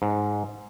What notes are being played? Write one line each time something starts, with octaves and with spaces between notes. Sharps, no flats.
G#2